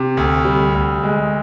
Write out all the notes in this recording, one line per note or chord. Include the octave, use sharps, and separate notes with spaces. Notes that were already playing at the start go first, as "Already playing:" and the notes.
Already playing: C3
D2
G3
D2
G#3